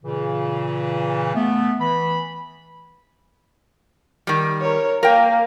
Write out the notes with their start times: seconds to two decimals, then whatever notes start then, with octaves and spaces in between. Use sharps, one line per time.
0.04 A#2 C#3 E3
1.35 A3 B3
1.80 E3 B5
4.27 D#3 G3
4.61 A#4 C#5
5.03 A#3 A#4 F5 G5